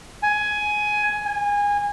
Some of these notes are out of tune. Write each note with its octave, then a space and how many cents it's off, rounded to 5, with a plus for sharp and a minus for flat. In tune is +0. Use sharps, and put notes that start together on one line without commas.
G#5 +15
G#5 -25